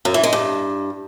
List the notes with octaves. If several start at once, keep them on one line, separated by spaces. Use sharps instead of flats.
F#2
E3
G#3
G2